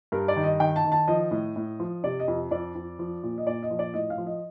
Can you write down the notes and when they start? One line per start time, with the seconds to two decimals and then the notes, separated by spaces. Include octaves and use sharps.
0.12 G2 A#4
0.28 D5
0.36 D#3
0.43 D#5
0.60 D#3 G5
0.76 A5
0.84 D#3
0.92 A5
1.08 F3 D#5
1.31 A2
1.56 A2
1.80 F3
2.04 C3 D5
2.20 D#5
2.28 F2
2.51 F2 D5
2.75 F2
2.99 F3
3.23 A#2
3.38 D#5
3.46 A#2 D5
3.63 D#5
3.70 F3
3.79 D5
3.94 A2 D#5
4.10 F5
4.18 F3
4.27 D#5